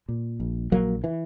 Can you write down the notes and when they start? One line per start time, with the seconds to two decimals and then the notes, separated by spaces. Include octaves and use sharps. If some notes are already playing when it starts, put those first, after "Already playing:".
0.09 A#2
0.40 A#1
0.72 A#1 F#3 A#3
1.04 E3